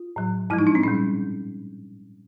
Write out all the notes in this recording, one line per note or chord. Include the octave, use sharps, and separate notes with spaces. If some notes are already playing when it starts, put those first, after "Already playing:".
Already playing: F4
A2 F#3
G#2 F3 G#3 E4
D#4
D4
C4
A#2 G3 C#4